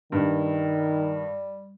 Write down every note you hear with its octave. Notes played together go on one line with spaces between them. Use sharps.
G2 D#3 G3